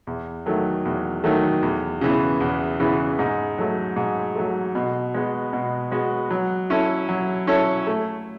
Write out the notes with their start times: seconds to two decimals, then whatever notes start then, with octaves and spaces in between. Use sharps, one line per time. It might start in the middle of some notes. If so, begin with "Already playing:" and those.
0.07 E2
0.46 D#3 F#3 A3
0.85 E2
1.24 D#3 F#3 A3
1.63 E2
2.01 C#3 E3 B3
2.40 E2
2.80 C#3 E3 B3
3.19 G#2
3.58 F#3 A3
3.96 G#2
4.36 F#3 A3
4.75 B2
5.14 G#3 B3 F#4
5.53 B2
5.91 G#3 B3 F#4
6.30 F#3
6.70 C#4 E4 A4 C#5
7.09 F#3
7.47 C#4 E4 A4 C#5
7.87 A3